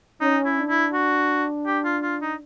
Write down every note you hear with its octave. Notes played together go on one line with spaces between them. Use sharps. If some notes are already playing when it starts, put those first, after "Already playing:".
C#4 D#4
E4
D4
E4
F#4
G4
F4
F4
D#4